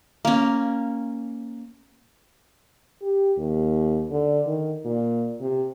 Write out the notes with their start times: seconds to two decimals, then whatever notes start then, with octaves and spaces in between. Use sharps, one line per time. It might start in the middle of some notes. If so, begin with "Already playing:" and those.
0.25 A#3 C#4
3.02 G4
3.38 D#2
4.11 D3
4.46 D#3
4.85 A#2
5.41 C3